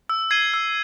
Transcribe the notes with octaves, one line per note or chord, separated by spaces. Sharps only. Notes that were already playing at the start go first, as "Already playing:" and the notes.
E6
G#6 C7 D#7 G7
E6